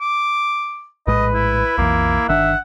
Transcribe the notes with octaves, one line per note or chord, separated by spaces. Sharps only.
D6
A#1 A2 G#3 B4 D#5
E4
B1 F2 E3 A#3
G1 D#3 D4 E5 F#5